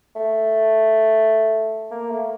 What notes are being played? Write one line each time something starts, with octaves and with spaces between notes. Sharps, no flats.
A3
A#3
A3